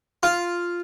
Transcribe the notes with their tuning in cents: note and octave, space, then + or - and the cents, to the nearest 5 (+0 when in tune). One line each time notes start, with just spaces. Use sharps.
F4 +0